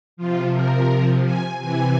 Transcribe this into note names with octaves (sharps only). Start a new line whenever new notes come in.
C3 F3 F4
A#4
G#5
C3 E3 G#5